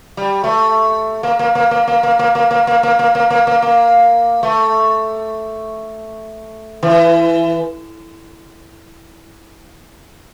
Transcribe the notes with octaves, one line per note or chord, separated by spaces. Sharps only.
G3
A3
A#3
A#3
A#3
A#3
A#3
A#3
A#3
A#3
A#3
A#3
A#3
A#3
A#3
A#3
A#3
A#3
A3
E3